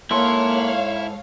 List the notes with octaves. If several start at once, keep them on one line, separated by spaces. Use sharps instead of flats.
G#2 A#3 E4 A4 C#5 F5 C6